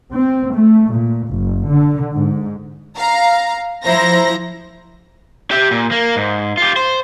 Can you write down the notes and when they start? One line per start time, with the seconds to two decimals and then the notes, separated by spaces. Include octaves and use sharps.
0.13 C4
0.54 A3
0.91 A#2
1.31 F#1
1.68 D3
2.14 G#2
2.97 F5 A#5
3.83 F3 E4 C5 A#5 A#6
5.51 G4 E5
5.71 A#2
5.91 A#3
6.16 G#2
6.58 F4 G4
6.76 C5